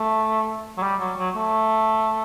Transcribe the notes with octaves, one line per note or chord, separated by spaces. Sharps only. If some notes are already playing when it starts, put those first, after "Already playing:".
Already playing: A3
F#3
G3
F#3
F#3
A3